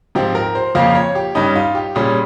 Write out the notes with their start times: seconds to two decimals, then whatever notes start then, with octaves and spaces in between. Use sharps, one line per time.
0.15 G#2 F3 C4 G4
0.35 A#4
0.55 C5
0.75 F2 C#3 F3 A#3 F5
0.95 C#5
1.15 G4
1.35 G2 G3 C#4 D#4
1.55 F4
1.75 G4
1.95 A#2 G3 C#4 G#4